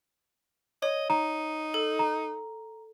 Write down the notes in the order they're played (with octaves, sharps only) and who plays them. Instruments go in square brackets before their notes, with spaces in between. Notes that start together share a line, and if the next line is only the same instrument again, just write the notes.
[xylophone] C#5 [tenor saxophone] D#5
[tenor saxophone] D#4 [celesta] A#5
[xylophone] A4
[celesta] A#5